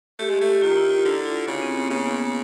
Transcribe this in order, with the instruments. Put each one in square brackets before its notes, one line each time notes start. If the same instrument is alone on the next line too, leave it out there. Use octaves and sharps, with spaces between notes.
[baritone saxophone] A3 [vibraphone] G4
[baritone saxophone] G#3
[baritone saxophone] A3 [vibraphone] G4
[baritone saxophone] D#3 [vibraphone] F4
[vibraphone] E4
F4
[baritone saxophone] D3 [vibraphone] E4
[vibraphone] F4
[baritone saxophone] C#3 [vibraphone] F#4
[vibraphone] C4
B3
[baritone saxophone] C#3 [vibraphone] A#3
[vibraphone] B3